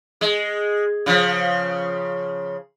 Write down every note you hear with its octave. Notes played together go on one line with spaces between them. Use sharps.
G#3
C#3 F3